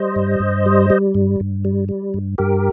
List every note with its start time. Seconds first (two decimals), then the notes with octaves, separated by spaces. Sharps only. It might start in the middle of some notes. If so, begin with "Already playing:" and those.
Already playing: G3 C5 D#5
0.16 G2
0.40 G2
0.66 G3
0.90 G3
1.15 G2
1.40 G2
1.65 G3
1.89 G3
2.14 G2
2.38 G2 G4 A#4